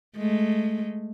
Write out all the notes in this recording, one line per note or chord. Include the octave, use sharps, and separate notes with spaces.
G#3 A3